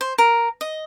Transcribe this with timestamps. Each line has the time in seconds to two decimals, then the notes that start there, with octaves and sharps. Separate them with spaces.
0.01 C5
0.18 A#4
0.61 D#5